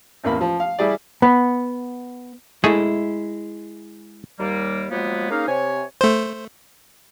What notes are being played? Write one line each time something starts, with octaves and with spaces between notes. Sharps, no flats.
A1 E2 A#3 B5
F3
F5
G3 E4 G#4 D5
B3
G#3 A3 E4 G#4
D#2 G3 A#3
F3 F#3 G#3 A#3 B3
A#3 C#4 D#4 G#4 F5
C3 C#5 G#5
A3 C5